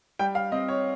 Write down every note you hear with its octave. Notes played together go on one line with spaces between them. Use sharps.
G3 G5
F5
C4 D#5
C#5